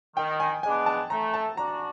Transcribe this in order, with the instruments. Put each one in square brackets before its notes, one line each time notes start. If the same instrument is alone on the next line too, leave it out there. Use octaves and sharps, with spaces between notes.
[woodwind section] D#3 [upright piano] G5
[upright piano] G#5
[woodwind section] G#3 B3 D4 [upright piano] G#5
[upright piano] A5
[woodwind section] A3 [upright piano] A#5
[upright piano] A5
[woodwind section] D4 F#4 [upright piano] A#5